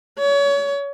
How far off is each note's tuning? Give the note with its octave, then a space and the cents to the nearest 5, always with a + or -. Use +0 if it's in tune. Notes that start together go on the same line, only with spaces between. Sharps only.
C#5 +30